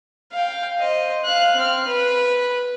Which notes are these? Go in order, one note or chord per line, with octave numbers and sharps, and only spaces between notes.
F5 G5
C5 D#5
F5 F#6
C4 F6
B4